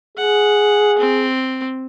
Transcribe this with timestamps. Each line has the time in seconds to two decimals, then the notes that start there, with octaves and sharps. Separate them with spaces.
0.18 G#4 F#5
0.98 C4